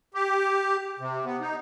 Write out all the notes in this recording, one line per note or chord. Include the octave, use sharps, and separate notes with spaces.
G4
C3
B3
D#4